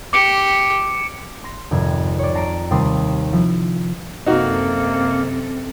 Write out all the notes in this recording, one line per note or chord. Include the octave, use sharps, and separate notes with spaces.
G4 D6 C#7 D7
C6 A#6
G#1 F2 C3 G#6
C#5 D5
A5 A#5 C7 D7
D#2 C3 G3 C6 D#6
F3 E4
F#2 C3 A#3 D#4 F#4 A4